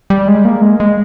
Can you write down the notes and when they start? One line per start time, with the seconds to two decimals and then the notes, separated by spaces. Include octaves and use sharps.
0.10 G3
0.28 G#3
0.45 A#3
0.62 G#3
0.80 G#3